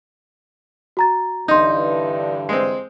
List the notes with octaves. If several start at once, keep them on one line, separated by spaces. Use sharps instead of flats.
F#4 A#5 A6
G2 D3 E3 D#4 C6 G6
G#3 C4